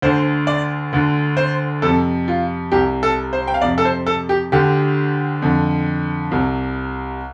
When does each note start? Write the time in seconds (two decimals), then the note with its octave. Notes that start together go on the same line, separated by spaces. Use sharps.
0.02 D2 D3 C5
0.47 D5
0.93 D2 D3
1.37 C5
1.82 F2 C3 A4
2.28 F4
2.72 C2 C3 G4
3.03 A4
3.33 C5
3.48 G5
3.54 F5
3.62 F2 C3 D5
3.78 A4
3.85 C5
4.07 A4
4.29 G4
4.52 D2 D3 G4
5.42 F2 D3
6.31 C2 C3